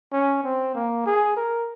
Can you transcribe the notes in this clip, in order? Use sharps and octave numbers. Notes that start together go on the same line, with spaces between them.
C#4
C4
A#3
G#4
A#4